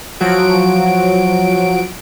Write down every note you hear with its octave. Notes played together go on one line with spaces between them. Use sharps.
F3 F#3 F#4 D7